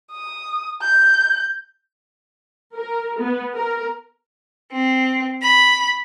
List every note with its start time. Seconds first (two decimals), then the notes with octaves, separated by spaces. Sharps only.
0.12 D#6
0.82 G6
2.75 A#4
3.19 B3
3.54 A#4
4.74 C4
5.42 B5